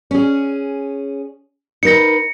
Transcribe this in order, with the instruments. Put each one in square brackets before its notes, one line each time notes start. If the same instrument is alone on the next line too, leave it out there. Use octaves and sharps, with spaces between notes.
[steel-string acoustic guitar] C#4 G#4
[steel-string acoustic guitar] D#4 A#4 B4 [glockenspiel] A#6 C#7